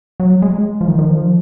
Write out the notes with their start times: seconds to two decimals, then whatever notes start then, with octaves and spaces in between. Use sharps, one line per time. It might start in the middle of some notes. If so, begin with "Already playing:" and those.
0.20 F#3
0.42 G#3
0.81 F3
0.88 D#3
0.99 D#3
1.10 F3